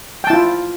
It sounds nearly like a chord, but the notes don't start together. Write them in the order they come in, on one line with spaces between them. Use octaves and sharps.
G5 A5 E4 F4